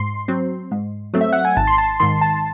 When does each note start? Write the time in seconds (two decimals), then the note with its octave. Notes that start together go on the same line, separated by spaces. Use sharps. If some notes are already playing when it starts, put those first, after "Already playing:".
Already playing: G#2 C6
0.28 F#3 C4
0.72 G#2
1.14 F#3 A3 C4
1.21 E5
1.33 F#5
1.45 G#5
1.57 G#1 A5
1.67 C6
1.78 A5
2.00 G#2 D#3 C6
2.21 A5